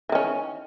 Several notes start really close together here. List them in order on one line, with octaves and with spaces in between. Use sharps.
E3 D#3 C#4